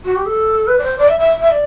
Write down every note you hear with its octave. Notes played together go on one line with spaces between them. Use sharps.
F#4
G4
A4
B4
D5
C5
D5
E5
E5
E5
D5